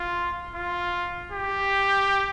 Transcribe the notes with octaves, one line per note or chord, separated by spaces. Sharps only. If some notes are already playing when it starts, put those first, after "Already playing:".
Already playing: F4
F4
G4